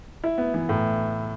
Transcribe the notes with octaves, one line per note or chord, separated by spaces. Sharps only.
E4
B3
E3
A2